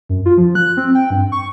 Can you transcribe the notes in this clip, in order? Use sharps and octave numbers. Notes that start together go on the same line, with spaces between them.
F#2
F4
F3
F#6
C4
G5
G2
C#6